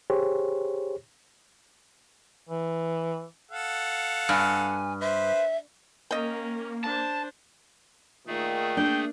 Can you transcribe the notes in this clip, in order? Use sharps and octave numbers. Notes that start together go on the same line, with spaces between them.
G4 G#4 C5 C#5
E3
A4 F5 F#5
G2 G#5
B4 C5 E5
A#3 C#4 A#4 D#5 G5
D4 C5 A5
A#2 D#3 A3 G#4
A#3 D4 G5